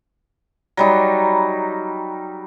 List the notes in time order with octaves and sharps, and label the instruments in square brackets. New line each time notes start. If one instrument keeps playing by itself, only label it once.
[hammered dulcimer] F#3 G3 D#4